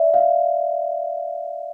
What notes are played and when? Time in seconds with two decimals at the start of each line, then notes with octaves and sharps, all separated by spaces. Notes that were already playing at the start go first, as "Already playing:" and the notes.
Already playing: D5 E5
0.14 F5